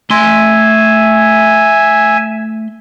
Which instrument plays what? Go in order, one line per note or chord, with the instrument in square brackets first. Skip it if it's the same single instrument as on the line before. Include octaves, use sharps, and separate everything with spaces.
[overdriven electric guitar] A3 C6 [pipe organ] E5 G#5